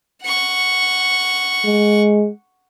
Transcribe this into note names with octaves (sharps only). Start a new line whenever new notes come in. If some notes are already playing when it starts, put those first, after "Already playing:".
F#5 C#6
G#3